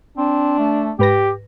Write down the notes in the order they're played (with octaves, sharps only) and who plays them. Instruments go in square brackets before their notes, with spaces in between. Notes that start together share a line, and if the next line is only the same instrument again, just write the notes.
[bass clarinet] C4 [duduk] D4
[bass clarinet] A3
[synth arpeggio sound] G#2 B4 A#6 [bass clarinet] G4